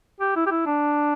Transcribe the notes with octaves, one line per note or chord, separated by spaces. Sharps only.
G4
E4
G4
E4
D4